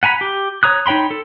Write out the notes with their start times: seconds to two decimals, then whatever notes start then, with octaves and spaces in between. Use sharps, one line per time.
0.03 F#5 G#5 A#5 B5
0.21 G4
0.63 C#5 A#5 D#6 F#6
0.86 D#4 C#5 G5 B5 C6
1.11 A4